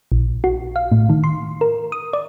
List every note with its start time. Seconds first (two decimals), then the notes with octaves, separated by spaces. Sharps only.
0.12 A#1
0.44 F#4
0.76 F5
0.92 A2
1.09 D#3
1.24 C6
1.61 A#4
1.92 D#6
2.13 D5